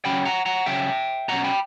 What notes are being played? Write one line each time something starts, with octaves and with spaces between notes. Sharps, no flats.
C#3 F#3 C#4 G5 B5
F#5 A#5
F#5 A#5
C#3 F#3 C#4 E5 G5
B2 F#3 C#4 F#5 A#5
G5 B5